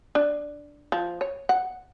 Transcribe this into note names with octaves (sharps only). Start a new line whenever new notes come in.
D4
F3
C#5
F#5